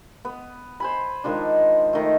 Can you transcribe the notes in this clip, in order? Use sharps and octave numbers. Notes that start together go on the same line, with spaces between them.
B3
C5 G#5 B5
D#3 F3 G#3 D4
D#3 A3